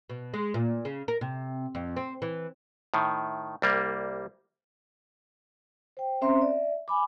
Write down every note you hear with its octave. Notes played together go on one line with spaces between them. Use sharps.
B2
G#3
A#2
C#3
A#4
C3
F2
C4
E3
A2 D#3
C2 G3 A#3
C5 G5
C4 C#4 C5 E5 A#5 C6
D5 E5
G#5 B5 D6